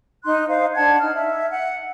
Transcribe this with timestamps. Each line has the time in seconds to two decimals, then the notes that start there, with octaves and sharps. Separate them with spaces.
0.25 D#4 C6 F#6
0.47 D#4 C5 F5
0.75 D4 F#5 A5 G#6
0.99 D#4 F6
1.14 E5
1.50 F#5